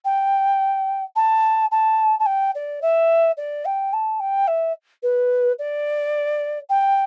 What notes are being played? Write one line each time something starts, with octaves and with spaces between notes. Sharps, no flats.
G5
A5
A5
A5
G5
D5
E5
D5
G5
A5
G5
E5
B4
D5
G5